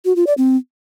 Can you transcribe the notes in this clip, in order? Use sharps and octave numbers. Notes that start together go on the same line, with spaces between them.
F#4
F4
D5
C4